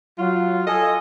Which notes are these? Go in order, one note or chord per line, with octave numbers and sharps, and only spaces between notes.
F#3 F4
A4 D#5 G#5